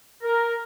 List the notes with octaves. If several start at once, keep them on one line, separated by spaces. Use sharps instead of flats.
A#4